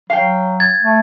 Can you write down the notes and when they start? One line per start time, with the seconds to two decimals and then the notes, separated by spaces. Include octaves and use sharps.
0.10 F#3 F5 G5
0.60 G#6 A6
0.83 A3